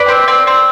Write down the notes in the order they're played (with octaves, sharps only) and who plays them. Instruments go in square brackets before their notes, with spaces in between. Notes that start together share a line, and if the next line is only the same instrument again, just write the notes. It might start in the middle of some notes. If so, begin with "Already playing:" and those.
Already playing: [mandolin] B4 D5
C4
C4
C4